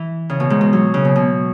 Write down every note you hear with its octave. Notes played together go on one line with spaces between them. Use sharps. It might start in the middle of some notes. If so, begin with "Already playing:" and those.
Already playing: E3
C#3
B2
G#2
B2
F#3
C#3
B2
B2